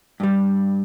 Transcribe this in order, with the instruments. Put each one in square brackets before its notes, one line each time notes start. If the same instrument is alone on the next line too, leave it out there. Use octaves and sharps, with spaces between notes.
[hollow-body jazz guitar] G2 G3